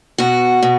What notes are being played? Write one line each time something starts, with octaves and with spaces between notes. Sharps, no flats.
B2 F#4
B2